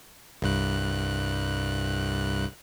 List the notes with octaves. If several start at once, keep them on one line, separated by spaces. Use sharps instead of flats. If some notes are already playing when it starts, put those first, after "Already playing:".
C2 G2 F#6